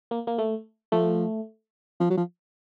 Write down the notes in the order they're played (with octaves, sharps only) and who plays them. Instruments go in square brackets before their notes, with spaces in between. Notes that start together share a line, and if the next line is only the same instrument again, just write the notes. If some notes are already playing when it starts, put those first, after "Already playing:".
[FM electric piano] A#3
A#3
A3
[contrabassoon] F3 [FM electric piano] A3
[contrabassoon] F3
F#3
F3